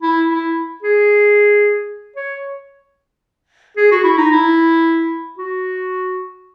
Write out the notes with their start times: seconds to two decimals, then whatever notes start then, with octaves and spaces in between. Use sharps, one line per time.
0.02 E4
0.29 E4
0.83 G#4
2.16 C#5
3.77 G#4
3.91 F#4
4.04 E4
4.18 D#4
4.31 E4
5.38 F#4